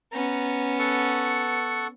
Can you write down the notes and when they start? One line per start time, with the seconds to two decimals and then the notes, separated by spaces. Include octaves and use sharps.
0.12 B3 C#4 A#5
0.79 A4 F#5 C#6